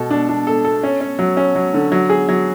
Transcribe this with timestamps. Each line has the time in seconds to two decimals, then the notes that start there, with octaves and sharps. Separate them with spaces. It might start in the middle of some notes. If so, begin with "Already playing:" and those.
Already playing: B2 A4
0.11 D4
0.29 D4
0.47 A4
0.65 A4
0.83 C#4
1.01 C#4
1.19 F#3
1.37 C#4
1.55 F#3
1.74 D3
1.92 F#3
2.10 G#4
2.29 F#3